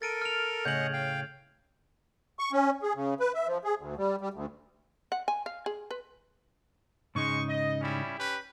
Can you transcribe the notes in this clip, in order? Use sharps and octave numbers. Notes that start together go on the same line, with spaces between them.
A4 A#4 A6 D7 D#7
F6 F7
A2 C#3 G#4 D#5 F#5 G6 G#6 F#7
F5 G5
C#6
C#4
G#4
C#3
B4
E5
F3
G#4
D2
G3
G3
D2
F#5
G#5
F5
G#4
B4
G#2 C#3 G#3 D#4 C#6
D#5
G3 C#4 E4
C#4 G4 B4